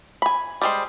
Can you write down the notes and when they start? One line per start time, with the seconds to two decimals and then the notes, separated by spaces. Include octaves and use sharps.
0.22 G#5 B5
0.62 G3 G#3 C5